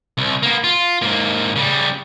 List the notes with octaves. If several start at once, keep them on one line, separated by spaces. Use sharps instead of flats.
C2
A#3 B3
F4
G#2 A#3
C#3 G3